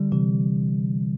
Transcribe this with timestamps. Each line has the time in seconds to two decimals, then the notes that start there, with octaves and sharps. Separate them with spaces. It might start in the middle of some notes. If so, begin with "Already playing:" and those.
Already playing: D3 G3
0.12 C3 E3